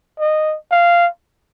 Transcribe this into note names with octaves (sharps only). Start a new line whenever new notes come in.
D#5
F5